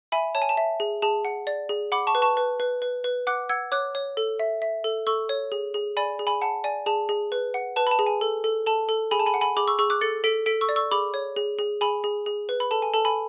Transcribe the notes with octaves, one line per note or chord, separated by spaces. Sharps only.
E5 G#5 B5
C#5 A5
G#5
A5
E5
G#4
G#4 A5
F#5
D5
G#4
F#5 B5 D6
A5 C#6
B4
A5 C#6
B4
B4
B4
B4
F#5 D6 F#6
F#5 E6 G#6
C#5 D6 F#6
C#5
A4
E5
E5
A4
A4 C#6 E6
C#5
G#4
G#4
D5 G#5 B5
G#4
G#5 B5
F#5 A5
D5 G#5
G#4 A5
G#4
B4
F#5
B4 A5
B5
A5
G#4
G#5
A4
A4
A4 A5
A4
G#4 G#5 B5
A5
G#5 B5
F#5
G#5 B5
G#4 B5 D6
C#6 E6
G#4 C#6 E6
D6 F#6
A4 A6 C#7
A4 B6 D7
A4 B6 D7
C#6 E6
D5
C#6 E6
G#4 B5 D6
C#5
G#4
G#4
G#4 G#5 B5
G#4
G#4
B4
B5
A4 A5
G#5
A4 A5
G#5 B5